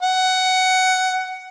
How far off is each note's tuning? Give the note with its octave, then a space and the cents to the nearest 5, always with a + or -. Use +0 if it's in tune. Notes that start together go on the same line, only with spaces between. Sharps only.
F#5 +15